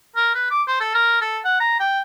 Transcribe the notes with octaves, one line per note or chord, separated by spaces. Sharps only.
A#4
B4
D6
C5
A4
A#4
A4
F#5
A#5
G5